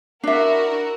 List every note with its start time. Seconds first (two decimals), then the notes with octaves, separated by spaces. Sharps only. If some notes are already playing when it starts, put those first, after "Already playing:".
0.23 D4 E4 F#4 A#4 E5